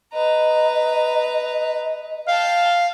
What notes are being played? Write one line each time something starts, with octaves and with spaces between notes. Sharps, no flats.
B4 D#5 A#5
F5 G5 A5